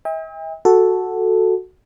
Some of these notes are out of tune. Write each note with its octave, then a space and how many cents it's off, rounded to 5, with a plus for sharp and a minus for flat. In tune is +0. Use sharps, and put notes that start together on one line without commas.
E5 -45 G5 +45
F#4 +0 A4 +0